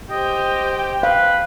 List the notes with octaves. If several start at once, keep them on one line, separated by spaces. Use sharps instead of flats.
G4 C5 D#5 G5
B4 F5